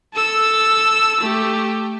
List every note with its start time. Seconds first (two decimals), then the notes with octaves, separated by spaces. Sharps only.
0.14 A4 E6
1.20 A3 G4